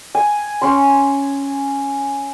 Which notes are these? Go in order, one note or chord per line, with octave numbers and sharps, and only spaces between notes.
G#5
C#4 C6